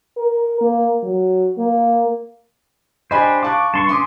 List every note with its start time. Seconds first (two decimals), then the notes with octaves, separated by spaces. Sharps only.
0.17 A#4
0.61 A#3
1.03 F#3
1.58 A#3
3.11 D4 G4 C5 D#5 G#5 B5
3.43 F5 A5 C#6 D6 F#6
3.74 G2 A5 C6 C#6
3.89 C#4 C6 D6 D#6